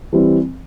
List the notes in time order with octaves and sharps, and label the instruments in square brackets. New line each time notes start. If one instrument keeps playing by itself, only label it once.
[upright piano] E3 G3 C4